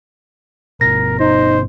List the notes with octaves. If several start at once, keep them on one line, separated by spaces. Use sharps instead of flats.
G1 B2 A#4 A#6
D#4 C5